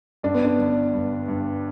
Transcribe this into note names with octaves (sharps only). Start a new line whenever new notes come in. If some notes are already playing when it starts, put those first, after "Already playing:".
G2 D4
B3
D4
G1
G2
G2